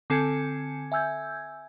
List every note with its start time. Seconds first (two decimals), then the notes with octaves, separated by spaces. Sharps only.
0.10 D3 C4 A4 G#5 G#6 C#7
0.92 E5 G#5 E6 G6 G#6